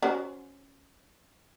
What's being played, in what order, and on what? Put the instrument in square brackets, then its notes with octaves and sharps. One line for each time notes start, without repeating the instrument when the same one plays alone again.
[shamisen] C#4 F#4 C5